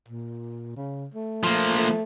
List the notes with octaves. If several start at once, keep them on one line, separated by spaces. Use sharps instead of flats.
A#2
C#3
A3
F3 A#3
A3